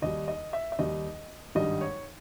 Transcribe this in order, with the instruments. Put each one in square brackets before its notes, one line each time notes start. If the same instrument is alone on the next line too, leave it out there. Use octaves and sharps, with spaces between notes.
[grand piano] D#2 D#3 G3 D#5
D#5
E5
E5
D#2 D#3 G3 D#5
G#1 G2 D#3 G3 D#5
C#5